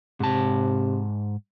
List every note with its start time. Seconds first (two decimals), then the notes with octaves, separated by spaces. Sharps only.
0.20 G#2 C3 A5